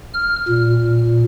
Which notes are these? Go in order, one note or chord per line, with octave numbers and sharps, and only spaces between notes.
F6
A#2